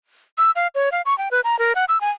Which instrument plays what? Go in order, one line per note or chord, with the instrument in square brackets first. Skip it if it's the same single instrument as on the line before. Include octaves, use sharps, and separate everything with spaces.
[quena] E6
F5
C#5
F5
C#6
G5
B4
A#5
A#4
F#5
E6
G#5